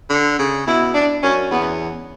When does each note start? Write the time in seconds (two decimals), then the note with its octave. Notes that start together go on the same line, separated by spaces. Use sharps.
0.10 D3
0.39 C#3
0.67 B2 E4
0.94 D4
1.23 F#2 C#4
1.51 E2 B3